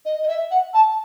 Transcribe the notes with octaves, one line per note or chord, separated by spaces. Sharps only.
D#5
D#5
E5
F#5
A5